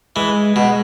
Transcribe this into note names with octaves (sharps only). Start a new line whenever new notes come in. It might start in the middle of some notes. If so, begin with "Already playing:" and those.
E3 G#3
B2 G#3